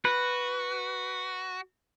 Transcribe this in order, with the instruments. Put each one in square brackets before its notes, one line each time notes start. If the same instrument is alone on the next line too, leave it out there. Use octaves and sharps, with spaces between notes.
[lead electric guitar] F#4 [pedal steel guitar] B4